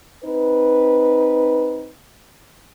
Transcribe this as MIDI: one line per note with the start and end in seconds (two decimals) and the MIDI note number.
0.24 1.90 60
0.24 1.90 63
0.24 1.90 71